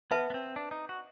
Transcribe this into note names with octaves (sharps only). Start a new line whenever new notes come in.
B3 B4 E5 A5
B3
C4
D4
D#4
F#4